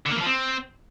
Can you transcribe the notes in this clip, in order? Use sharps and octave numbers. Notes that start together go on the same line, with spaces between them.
D3
A#3
E3
F3
C4